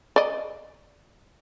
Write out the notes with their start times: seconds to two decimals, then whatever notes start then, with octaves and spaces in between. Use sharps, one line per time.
0.16 D5 D#5